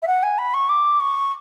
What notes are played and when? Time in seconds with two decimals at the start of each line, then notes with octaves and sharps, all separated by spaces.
0.02 E5
0.07 F#5
0.23 G#5
0.38 B5
0.54 C#6
0.69 D6
1.00 C#6